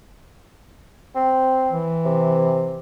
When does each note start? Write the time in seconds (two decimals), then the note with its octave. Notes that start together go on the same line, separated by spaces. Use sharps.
1.15 C4
1.72 E3
2.05 C3